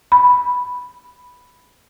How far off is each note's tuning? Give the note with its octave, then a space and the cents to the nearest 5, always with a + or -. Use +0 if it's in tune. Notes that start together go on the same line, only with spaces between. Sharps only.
B5 +0